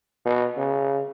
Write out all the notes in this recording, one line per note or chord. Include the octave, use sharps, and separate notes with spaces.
B2
C#3